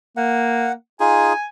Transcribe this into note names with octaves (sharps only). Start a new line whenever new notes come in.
A#3 F#5
D#4 F4 G#4 G#5